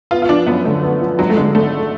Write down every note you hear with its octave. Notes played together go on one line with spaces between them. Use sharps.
B3 F4
F4
F3 D4
F#2 B3
D3 A3
B3
F3
G#1 F#3
A3
D3 G#3
G#1 A3